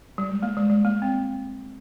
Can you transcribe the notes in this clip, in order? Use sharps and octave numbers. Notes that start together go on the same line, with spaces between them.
G3
G#3
A#3
G#3
G#3
A#3
C4